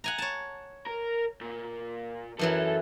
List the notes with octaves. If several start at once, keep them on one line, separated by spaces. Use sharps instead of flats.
F#5 G#5 A#5
C#5 A5
A#4
A#2
F#2 E3 F#3 A4